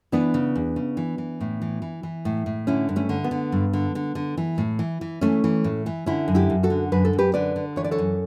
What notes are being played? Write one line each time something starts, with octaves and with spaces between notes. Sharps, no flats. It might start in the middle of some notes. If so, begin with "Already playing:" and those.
E3 B3 D4
C#3
E2
C#3
E3
E3
A2
E3
E3
E3
A2
A2
D3 C#4 E4
G2
A3 C#4
D3
B3
D3
G2
D3
D3
D3
E3
A2
E3
E3
E3 A3 C#4
E3
A2
E3
D3 C#4 E4
F#2
E4 G4
F#2
F#4 A4
D3
F#2 B4
A4
F#2
G4 B4
D3 B4 D5
D3
E3 C#5
D5
A4 C#5
F#2